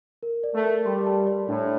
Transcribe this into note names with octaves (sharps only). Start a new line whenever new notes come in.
A#4
D5
A3
A#4
G3 C6
A5
D5
A2 D4